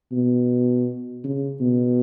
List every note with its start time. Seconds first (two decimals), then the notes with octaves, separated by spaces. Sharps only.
0.12 B2
1.24 C#3
1.61 B2